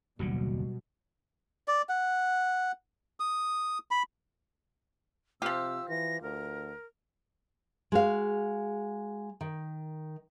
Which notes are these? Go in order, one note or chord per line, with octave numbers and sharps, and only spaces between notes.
F#1 D#2 B2 D3 F#3 G3 F#4
D5
F#5
D#6
B5
C3 F3 F4 G4 E6
E3 A#6
D2 A#4
G#3 F#4 F5
D#3